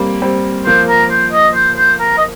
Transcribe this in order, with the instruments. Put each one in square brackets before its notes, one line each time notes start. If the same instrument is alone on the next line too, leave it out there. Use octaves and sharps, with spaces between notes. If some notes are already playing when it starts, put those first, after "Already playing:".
Already playing: [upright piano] G3 A#3 C4
G3 C4
[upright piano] F3 A#3 [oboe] C5
[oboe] A#4
C5
D#5
C5
C5
A#4
D#5